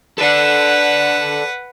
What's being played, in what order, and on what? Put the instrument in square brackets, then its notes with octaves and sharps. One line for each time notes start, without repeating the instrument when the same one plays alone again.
[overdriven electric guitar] A4 D5 [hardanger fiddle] B4 F#5